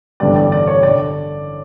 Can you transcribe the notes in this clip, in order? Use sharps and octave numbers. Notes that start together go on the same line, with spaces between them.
A1 G2 D3 G3 B3 D5
D5
D5
C#5
D3 D5